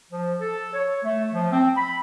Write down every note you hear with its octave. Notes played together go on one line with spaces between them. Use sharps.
F3
A4
C#5
A3
F3
C4
B5